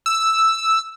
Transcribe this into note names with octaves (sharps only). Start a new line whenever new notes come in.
E6